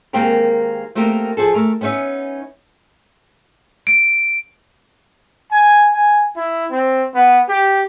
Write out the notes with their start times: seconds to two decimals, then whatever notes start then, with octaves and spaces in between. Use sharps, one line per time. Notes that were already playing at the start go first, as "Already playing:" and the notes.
0.13 D#3 G#3 A#3 C4 G4 A#4
0.95 A3 A#3 C4 G4 A#4
1.37 F3 G#4 A4
1.54 A3 A#4
1.81 B3 C#4 D#4 C#5 E5
3.87 D7
5.52 G#5
5.93 G#5
6.36 E4
6.71 C4
7.14 B3
7.48 G4